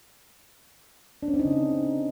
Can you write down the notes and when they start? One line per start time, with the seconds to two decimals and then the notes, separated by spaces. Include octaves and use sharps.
1.23 D4
1.28 C#4
1.34 C4
1.39 D#4
1.45 C#3